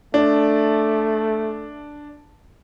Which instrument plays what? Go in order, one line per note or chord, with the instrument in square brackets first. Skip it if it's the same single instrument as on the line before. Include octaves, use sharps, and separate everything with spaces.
[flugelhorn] A3 [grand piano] D4